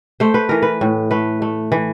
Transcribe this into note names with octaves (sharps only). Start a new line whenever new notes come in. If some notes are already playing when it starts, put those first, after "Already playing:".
A3 C5
B4
E3 A#4
B4
A2
A3 B4
A3
E3